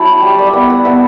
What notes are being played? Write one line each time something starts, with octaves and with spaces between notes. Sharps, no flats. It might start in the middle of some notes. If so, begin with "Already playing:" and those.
Already playing: F#3 E4 G5 A5 B5
G3
D5
E5
B3 F#5
F#5
B3 E5